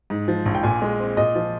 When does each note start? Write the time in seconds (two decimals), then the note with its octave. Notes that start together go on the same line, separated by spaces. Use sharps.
0.10 G#2
0.28 F3
0.46 A#1
0.55 G5
0.63 A#2 G#5
0.82 G#3
1.00 C4
1.17 A#2 D#5
1.35 F3